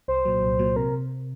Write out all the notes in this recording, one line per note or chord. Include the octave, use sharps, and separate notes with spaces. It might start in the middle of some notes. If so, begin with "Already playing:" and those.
C2 C5
A#2 F#3
C2
A#2 F#3
C3 A#4